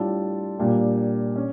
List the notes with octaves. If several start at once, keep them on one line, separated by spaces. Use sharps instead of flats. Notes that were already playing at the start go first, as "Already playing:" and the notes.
Already playing: A2 G3 D4 F4 A4
A#2 G3 A#3 D4 G4
C#4